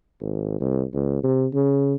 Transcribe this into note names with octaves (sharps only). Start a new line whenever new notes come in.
G#1
C2
C#2
C3
C#3